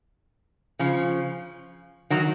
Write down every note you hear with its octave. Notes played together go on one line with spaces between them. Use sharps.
C#3 F3
D#3 F#3